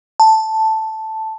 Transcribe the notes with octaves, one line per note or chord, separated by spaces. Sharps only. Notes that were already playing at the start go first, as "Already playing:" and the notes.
A5